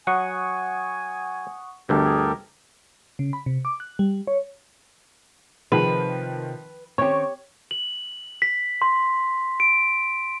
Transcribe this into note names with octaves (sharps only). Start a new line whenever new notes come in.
F#3 F#5 G#5 C#6 D#6
G1 D2 G2 G4 A4 A#4
G#4
C#3
B5
C3
D6
F#6
G3
C#5
C3 D#3 F3 G#4 B4 F5
D#3 C4 C#4 G4 C#5 C#6
F#7
B6
C6
D7